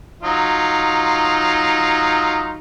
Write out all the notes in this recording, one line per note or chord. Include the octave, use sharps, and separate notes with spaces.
F#3 D#4 F4